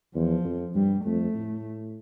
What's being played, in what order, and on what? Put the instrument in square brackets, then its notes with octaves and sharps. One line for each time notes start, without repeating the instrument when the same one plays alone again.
[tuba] E2 [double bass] F3
[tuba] F2
[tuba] G2 [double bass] G3
[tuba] F2 [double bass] A3
[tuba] A2